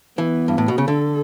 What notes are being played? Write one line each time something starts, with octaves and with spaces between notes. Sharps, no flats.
E3 B3
G2
A2
B2
C#3
D3 A4